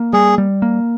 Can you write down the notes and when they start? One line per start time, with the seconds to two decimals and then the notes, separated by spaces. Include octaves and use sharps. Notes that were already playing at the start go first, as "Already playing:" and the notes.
Already playing: A#3
0.13 G3 G#4
0.38 G3
0.62 A#3